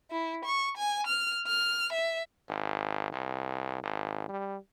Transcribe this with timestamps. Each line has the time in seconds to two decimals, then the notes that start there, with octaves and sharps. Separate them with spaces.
0.11 E4
0.45 C#6
0.77 G#5
1.07 F6
1.47 F6
1.93 E5
2.49 G#1
3.12 C2
3.83 G#1
4.29 G3